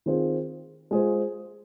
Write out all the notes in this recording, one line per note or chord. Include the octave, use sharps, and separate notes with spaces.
D#3 C4 F4 G#4 C5
G#3 F4 G#4 C5